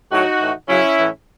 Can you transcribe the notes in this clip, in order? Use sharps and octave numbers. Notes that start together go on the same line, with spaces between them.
A2 F#3 D#4 F#4
A2 E3
F#2 C#3 F#3 C#4 E4
A2 E3